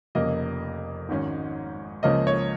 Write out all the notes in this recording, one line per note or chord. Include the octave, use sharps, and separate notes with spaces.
F1 F2 C#3 A#3 D#5
G#1 G#2 D#3 C#4
C#2 C#3 F3 A#3 C#4 D#5
C#5